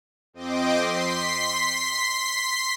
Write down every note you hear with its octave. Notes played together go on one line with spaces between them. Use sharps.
F2 C4 D#5 G5 C6 D6
C6 B6 C7